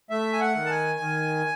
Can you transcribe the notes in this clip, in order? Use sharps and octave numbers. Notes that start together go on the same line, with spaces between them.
A3 E5
G#5
F#5
D#3
A5
G#5
D#3